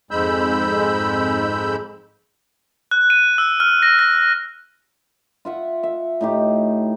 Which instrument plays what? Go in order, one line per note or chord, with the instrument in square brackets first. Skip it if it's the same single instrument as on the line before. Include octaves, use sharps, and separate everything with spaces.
[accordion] F2 G#2 G#3 B5 E6 G6
[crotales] F#6
D#7
E6
F6
A#6
A#6
[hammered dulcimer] F4 E5 F#5
E5
A2 D#4 G4